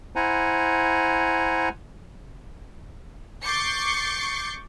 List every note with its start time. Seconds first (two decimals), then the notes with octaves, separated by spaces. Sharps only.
0.16 E4 C5 F#5 G#5 A#5
3.45 C#6 D6 G6 A6 C7 C#7